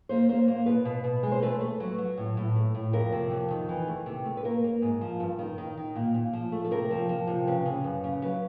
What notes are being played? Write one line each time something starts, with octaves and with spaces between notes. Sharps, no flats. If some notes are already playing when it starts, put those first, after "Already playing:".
A#3 C5
A#3 C5
A#3 C5
B2 B4
B2
B2
G#3
C5
A3 B4
A3
F#3
F#3
A2
A2
A3
A2
F2 A#4
C3
F2
D#3
E3
A3
C3
A3
B4
A#3 A#4
A#3
G#2
F3
G2
D#3
D#3
D#3
A#2
A#2
F3
A3
A4
C3 A#4
F3
F3
C3
C#3 B4
C#3
F#2
C#3
F#3 B4